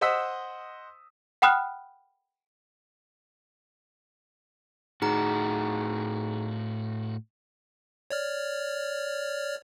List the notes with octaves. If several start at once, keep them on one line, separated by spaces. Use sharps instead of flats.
C5 D#5 F#5 D#6 E6 B6
F#5 G5 B5 D#6 F6 F#6
A2 D#4 F#4 G#4 A#5
C#5 D5 F6